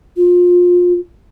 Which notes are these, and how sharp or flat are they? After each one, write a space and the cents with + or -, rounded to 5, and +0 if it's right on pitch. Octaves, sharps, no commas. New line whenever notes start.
F4 +25